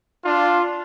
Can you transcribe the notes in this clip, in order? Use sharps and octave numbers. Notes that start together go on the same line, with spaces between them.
D4 F4